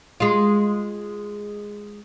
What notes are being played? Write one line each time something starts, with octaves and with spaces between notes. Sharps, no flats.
G#3 F4